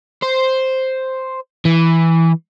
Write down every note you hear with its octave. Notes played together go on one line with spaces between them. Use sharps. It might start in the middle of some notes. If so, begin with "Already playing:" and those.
C5
E3